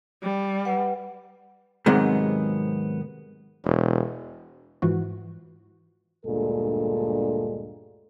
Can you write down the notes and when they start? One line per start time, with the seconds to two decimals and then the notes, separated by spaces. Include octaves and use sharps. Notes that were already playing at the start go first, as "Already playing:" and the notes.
0.23 G3
0.65 B4 F#5
1.86 G#2 C3 D#3 F#3 G#3 B3
3.65 E1
4.82 G#2 E3 F3 F#4
6.25 D2 G2 A#2 G#3 A4